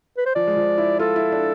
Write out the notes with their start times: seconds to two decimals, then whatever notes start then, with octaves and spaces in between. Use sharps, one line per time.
0.17 B4
0.26 C5
0.35 F3 D5
0.47 G#3
0.57 F3
0.78 E4
0.99 F4 A4
1.16 E4
1.32 D4